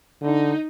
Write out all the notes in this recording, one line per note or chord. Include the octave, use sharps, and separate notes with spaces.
D3 D#4